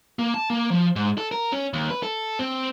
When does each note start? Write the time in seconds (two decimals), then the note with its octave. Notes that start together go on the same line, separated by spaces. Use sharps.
0.19 A#3
0.34 A5
0.50 A#3
0.71 F3
0.96 G#2
1.18 A4
1.31 A#4
1.52 C#4
1.74 D#2
1.90 B4
2.03 A4
2.39 C4